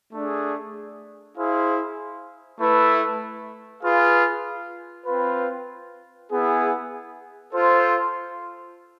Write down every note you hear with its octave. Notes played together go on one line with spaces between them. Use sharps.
A3 D4 G#4
E4 G#4 C5 F5
A3 E4 B4
F4 G#4 B4 F5
C4 F4 B4
B3 E4 G#4
F4 A4 C5